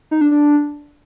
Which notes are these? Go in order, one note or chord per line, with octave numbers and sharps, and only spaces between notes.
D#4
D4
D4